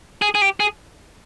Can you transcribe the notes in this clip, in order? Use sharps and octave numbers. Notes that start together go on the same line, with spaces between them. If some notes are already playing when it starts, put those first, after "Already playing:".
G#4
G#4
G4
G#4